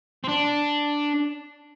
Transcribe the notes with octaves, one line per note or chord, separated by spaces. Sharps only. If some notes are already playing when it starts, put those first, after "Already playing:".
C4
D4